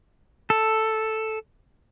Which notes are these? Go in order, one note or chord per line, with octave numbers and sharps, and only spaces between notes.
A4